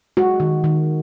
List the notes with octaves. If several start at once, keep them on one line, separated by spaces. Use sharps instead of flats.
G#3 F#4
D#3
D#3